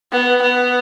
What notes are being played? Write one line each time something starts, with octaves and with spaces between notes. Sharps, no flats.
B3
B3